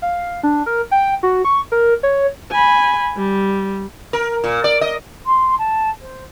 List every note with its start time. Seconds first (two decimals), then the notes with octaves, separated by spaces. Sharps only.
0.02 F5
0.43 D4
0.66 A#4
0.91 G5
1.23 F#4
1.45 C#6
1.72 A#4
2.03 C#5
2.52 G#5 B5
3.17 G3
4.13 A#4
4.44 A#2
4.64 D5
4.81 D#5
5.26 C6
5.58 A5
6.00 C5